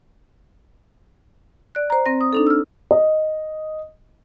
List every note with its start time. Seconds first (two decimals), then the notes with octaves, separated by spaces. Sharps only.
1.75 D5 F#6
1.90 C5 A#5
2.06 C4 A#6
2.21 D#6
2.33 D4 D#4 A4
2.47 E6 F6
2.91 D#5